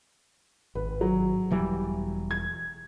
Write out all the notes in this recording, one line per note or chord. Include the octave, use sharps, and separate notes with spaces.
G#1 B4
F#3
E1 E3 G3
G#6